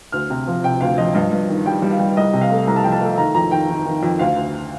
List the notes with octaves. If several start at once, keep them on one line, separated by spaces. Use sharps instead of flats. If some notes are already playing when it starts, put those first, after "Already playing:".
D2 F6
C3
F3
C3 G5
D2 F5
F3 D#5
G2 D#5
G2
D#3
G3 G5
G3
F5
G3
C2 D#5
C3
F5
A3
C2 A#5
A5
F3 G5
A5
A3
D#3 A#5
F2 A#5
D#3 G5
D#3
D#3
F2
D2 F5
D2